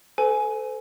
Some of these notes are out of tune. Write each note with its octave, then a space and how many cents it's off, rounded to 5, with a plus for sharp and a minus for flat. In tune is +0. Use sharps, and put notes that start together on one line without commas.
A4 +0 C5 -45 G#5 +15